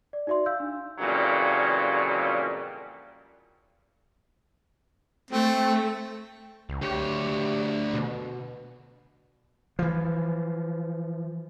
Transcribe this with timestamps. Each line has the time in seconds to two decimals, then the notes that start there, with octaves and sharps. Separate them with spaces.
0.13 D5
0.27 D#4 F#4 D5 E5 C6
0.46 F5 E6 G6
0.60 D4
0.99 F2 A#2 C#3 E3 F#3 G3
5.30 A3 C4
6.69 C#2
6.82 D2 G4 C#5
7.94 B2
9.79 E3 F3